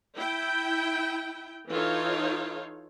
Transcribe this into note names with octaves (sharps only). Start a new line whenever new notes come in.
E4 G5
E3 D#4 F4 A4 C#5 F5